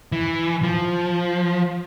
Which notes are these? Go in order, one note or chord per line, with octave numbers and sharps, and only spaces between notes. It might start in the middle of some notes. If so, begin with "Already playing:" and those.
E3
F3